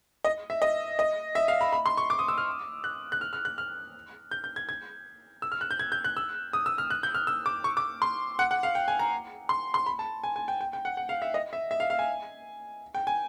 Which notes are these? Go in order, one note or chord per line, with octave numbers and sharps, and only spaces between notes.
D#5
E5
D#5
D#5
E5
F5
B5
B5
C6
C#6
D6
D#6
E6
F6
F#6
F#6
F6
F6
F#6
F6
G6
G6
G#6
G#6
E6
F6
F#6
G6
G#6
G6
F#6
E6
D#6
E6
F6
F#6
G6
F6
E6
D6
C#6
D6
C6
F#5
F#5
F5
G5
G#5
A#5
C6
C6
B5
A5
G#5
G#5
G5
G5
G5
F#5
F#5
F5
E5
D#5
E5
E5
F5
F5
G#5
G5
G#5